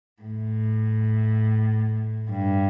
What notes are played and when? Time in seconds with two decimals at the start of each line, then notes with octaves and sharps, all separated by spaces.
0.23 A2
2.30 G2